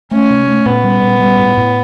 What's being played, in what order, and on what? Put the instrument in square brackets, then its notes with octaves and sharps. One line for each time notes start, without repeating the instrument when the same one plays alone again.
[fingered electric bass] A3 [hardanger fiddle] C#4
[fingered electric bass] C3
A3
[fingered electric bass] A#2 [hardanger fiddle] B3
[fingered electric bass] G3
A#2
G3
A2
A2